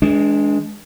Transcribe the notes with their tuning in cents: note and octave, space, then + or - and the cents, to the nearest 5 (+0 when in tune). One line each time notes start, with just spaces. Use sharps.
E3 -25 G#3 +15 D4 -20